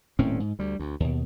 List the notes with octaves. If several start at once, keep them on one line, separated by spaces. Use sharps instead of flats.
D#1 A2 C4 C#4
G#2
D2 G3
D2
D#2 B2